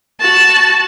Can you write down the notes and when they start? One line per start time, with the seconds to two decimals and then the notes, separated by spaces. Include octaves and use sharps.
0.21 F#4 A5